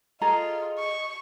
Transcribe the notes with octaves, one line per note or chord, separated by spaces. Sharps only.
F4 G#4 A4 D#5 A#5
C#6